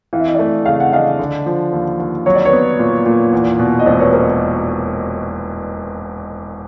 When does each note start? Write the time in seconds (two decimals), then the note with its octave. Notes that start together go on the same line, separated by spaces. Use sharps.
0.13 E3 F5
0.20 E5
0.27 D#5
0.35 D5 E5
0.39 A3
0.66 C#3 F5
0.80 F#5
0.92 D4 D#5 F5
1.19 D3
1.46 F3
1.72 D#2
1.99 D#2
2.26 F#3 C#5
2.35 D5
2.45 B4 C#5
2.53 B3
2.79 A#2
3.06 A#2
3.32 E2
3.59 B2
3.79 D#5
3.86 E1 C5 D5
3.99 B4 C#5
4.12 A#4 C5